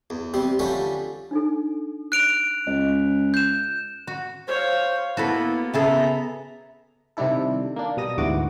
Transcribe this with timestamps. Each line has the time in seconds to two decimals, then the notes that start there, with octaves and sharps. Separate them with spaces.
0.10 E2
0.34 C3 G3 C4
0.59 D3 F3 G3 A3 C#4 E5
1.31 D4 D#4 A4
2.12 F#6 D7 F7
2.67 C#2 D#5
3.34 G6 E7
4.07 F#4
4.48 C5 C#5 F5
5.17 A#3 B3 E4 F#4 A4 B4
5.74 C#3 B3 G#4 A4 E5 A#5
7.17 C3 D#3 G3 D4 E4 A4
7.76 A#3 D4
7.97 B2 G3 D#6 A#6
8.18 D2 G#2 E3 F#4 D6